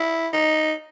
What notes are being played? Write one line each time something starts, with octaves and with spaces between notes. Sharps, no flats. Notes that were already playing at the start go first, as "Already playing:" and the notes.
Already playing: E4
D#4